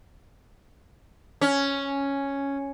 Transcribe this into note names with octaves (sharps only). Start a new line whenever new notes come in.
C#4